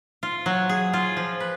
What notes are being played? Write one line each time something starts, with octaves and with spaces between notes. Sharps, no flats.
F4
F#3
G#4
F4
F3
B4